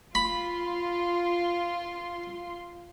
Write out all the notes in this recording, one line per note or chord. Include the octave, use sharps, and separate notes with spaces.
F4 B5 C6